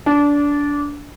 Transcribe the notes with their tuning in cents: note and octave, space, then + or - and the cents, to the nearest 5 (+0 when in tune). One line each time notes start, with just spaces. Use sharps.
D4 -20